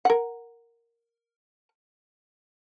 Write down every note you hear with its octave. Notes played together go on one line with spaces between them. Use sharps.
A#4 F#5